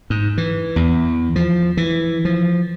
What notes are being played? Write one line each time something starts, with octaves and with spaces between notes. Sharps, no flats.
G#2
E3
E2
F3
E3
F3